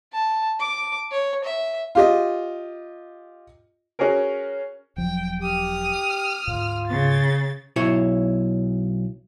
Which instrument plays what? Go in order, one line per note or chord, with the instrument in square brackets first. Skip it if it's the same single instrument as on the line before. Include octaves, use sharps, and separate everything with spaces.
[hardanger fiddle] A5
D6
C#5
E5
[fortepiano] F4 G4 D#5
[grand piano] C#4 F#4 G#4 A#4
[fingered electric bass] E1 F3 F#3 [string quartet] G5
[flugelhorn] G4 [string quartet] D#6 F6
[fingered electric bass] D2 G#2 [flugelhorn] F4
[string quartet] C#3 A6
[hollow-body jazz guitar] B1 E4 C#5